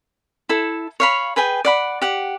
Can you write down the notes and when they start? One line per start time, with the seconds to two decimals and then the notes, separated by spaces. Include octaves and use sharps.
0.49 E4 A4
1.00 C#5 F5 B5
1.36 G#4 B4 G5 G#5
1.65 D5 F#5 B5
2.02 G4 F#5